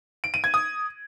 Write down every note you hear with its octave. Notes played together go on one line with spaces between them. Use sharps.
D7
D#7
G#6
D#6